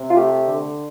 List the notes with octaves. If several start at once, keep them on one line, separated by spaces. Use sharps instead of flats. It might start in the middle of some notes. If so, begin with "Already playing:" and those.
Already playing: C3
F4
A3 G4
D3